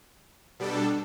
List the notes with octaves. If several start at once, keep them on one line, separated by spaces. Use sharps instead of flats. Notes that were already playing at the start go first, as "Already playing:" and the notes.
B2 G3 D4 A4